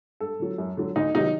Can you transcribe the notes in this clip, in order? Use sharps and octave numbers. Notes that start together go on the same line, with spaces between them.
G2 A4
D3 F#3
F#2
D3 F#3
D2 D#4
C3 D#3 F#3 D#4